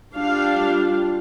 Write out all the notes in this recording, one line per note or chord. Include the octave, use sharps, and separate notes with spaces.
G3 D4 F4 F5